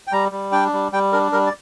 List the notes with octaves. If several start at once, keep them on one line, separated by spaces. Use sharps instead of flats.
G5
G3 A#5
G3
D4 G5
G3
G3 G5
D4 A#4
G3 A#4
D5